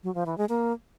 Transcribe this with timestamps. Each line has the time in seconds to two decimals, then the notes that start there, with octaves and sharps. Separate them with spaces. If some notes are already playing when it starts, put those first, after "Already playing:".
0.03 F#3
0.15 F3
0.26 E3
0.38 G#3
0.49 A#3